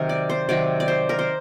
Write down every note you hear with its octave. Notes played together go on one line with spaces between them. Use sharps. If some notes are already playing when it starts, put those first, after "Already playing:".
Already playing: C3 D#3 F#3 A#4
D5
C5
C3 D#3 F#3 D5
D5
C5
A#4
C5